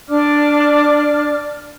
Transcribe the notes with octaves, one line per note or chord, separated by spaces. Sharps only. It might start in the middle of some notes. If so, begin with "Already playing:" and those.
D4 D5 D6 F6